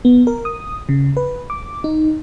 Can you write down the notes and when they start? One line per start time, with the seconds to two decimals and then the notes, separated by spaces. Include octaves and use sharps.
0.05 B3
0.27 A#4
0.45 D#6
0.89 C#3
1.17 B4
1.50 D6
1.84 D#4